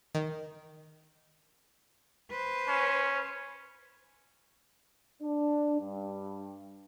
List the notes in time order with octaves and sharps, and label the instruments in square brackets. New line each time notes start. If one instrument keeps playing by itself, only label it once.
[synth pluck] D#3
[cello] B4 C5
[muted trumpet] C#4
[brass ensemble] D4
G2